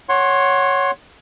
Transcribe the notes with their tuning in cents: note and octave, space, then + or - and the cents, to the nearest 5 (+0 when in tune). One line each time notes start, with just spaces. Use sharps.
C#5 +0 F#5 +0 C6 +20